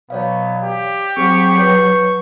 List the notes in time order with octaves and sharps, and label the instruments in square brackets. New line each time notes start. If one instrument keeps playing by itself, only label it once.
[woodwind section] B2 E3 F#3 [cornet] B3 [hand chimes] C#5 D5 F5
[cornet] G4
[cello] F#3 [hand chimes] C4 G#4 [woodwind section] C#6
[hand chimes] B4 C#5 G6